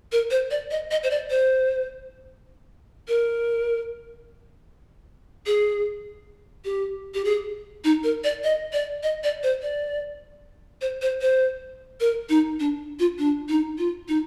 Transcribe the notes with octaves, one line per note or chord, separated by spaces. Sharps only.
A#4
C5
D5
D#5
D#5
C5
D5
C5
A#4
G#4
G4
G4
G#4
D#4
A#4
D5
D#5
D5
D#5
D5
C5
D5
C5
C5
C5
A#4
D#4
D4
F4
D4
D#4
F4
D#4